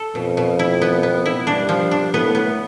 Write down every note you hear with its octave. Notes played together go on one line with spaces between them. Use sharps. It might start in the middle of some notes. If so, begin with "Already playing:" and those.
Already playing: A4
F2 B2
B2
E4
B3
B3
E4
G2 D4
F3
D4
A2 B3
B3